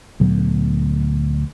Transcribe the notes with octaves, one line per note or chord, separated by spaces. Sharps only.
D2 A#2 F#3 B3